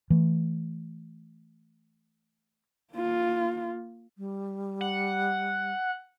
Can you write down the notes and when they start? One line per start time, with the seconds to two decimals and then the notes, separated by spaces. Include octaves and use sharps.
0.10 E3 A3
2.93 A#3 F4
4.18 G3
4.81 F#5